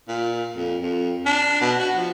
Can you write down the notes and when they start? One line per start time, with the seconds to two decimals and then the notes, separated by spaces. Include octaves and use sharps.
0.08 A#2
0.57 F2
0.82 F2
1.26 D4
1.61 B2
1.80 F#4
1.97 F3